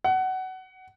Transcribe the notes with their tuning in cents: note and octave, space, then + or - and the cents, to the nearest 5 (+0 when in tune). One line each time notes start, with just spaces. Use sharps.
F#5 +20